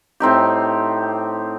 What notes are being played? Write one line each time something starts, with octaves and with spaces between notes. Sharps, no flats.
A2 C4 D#4 G4